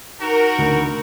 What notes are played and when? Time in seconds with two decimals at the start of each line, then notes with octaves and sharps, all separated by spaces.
0.21 D#4 F#4 A#4
0.58 D2